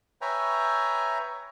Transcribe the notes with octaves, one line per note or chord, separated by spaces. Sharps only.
B4 C#5 E5 G5 G#5 A#5